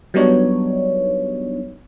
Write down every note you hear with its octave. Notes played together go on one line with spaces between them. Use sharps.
F#3 G3 B3 D4 D#4 C#5